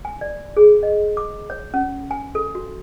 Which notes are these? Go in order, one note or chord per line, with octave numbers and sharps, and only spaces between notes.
G#5
D5
G#4
D#5
D6
C#5
C#4
G#5
A4
F#4